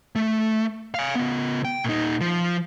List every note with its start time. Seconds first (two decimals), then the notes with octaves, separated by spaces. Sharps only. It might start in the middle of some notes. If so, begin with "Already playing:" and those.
0.16 A3
0.94 F5 G#5
1.15 C#3 B3
1.65 G5
1.84 A#2 D#4
2.21 F3